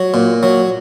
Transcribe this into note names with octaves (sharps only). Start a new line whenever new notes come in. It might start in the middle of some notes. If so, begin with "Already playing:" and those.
Already playing: F#3
A#2
F#3